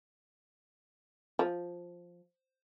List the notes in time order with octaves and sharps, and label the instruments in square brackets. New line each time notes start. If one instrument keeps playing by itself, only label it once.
[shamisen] F3